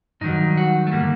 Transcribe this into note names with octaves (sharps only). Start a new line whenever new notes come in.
G2 D#3 F#3 D#4
F#4
A3
D3 G3 A#3